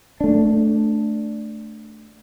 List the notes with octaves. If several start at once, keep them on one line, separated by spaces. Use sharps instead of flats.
A3 D4